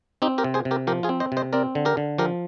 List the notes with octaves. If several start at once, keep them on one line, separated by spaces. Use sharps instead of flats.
C4 D#4 G4
G4 A#4
C3
G#4 C5
C3
G4 A#4
F3 G4 A#4
F4 G#4
C4
C5 D#5
C3 C5 D#5
C4 A#4 D5
D3
G4 A#4
D3
F3 G4 A#4